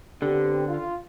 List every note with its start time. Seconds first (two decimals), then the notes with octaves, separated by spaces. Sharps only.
0.22 D3 B3 C4 G4
0.68 F4